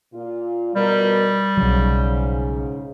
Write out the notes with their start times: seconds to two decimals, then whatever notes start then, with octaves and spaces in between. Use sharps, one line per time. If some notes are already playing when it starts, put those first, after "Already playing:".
0.14 A#2 F4
0.75 B2 G3 A#4
1.58 B1 G#2 C#3 F#3